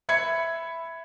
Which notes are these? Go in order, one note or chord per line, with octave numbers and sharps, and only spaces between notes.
E5 B5 G#6 C#7